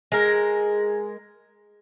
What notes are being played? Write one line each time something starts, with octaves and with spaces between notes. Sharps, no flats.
G#3 A#4